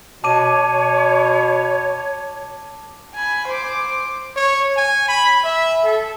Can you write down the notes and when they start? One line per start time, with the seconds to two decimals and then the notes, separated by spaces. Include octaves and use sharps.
0.24 B2 C#5 A5 D6 D#7
3.15 G#5 B5
3.47 C5 D6
4.36 C#5
4.77 G#5
5.08 B5
5.44 E5
5.85 A4